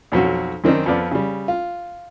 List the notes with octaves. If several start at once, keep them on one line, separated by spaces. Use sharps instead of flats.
B1 F2 F#3 F#4
F#2 D#3 C4 D4 D#4
F2 F3 B3 D5
C#3 G3
F4